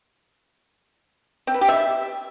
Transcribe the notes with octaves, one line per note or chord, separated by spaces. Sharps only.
C4
B4
G4
E5